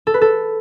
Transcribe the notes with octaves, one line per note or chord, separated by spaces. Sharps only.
A4
B4
A4